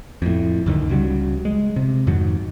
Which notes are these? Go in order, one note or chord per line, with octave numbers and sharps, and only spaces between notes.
F2 A2
C#2 F#2 D3 D#3
C#2 C#3 F#3 G3
G#3
C3
F2 G#2 D#3 F#3